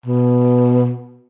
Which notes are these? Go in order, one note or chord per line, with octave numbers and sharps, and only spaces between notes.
B2